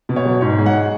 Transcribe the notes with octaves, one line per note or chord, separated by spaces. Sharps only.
B2
C#5
F#3
G#2 C#5
G#3
F#5